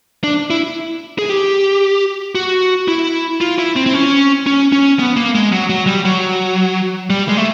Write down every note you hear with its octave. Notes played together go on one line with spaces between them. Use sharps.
D4
E4
G#4
G4
F#4
E4
F4
E4
C4
C4
C#4
C#4
C#4
B3
A#3
G#3
F#3
F#3
G3
F#3
G3
G#3
A3